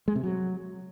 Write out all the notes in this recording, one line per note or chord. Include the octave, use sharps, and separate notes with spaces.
G#3
C3
F#3